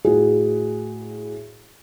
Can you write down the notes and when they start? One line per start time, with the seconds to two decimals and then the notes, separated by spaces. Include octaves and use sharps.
0.05 A2 F#4 G#4